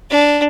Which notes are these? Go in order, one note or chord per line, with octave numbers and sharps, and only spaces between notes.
D4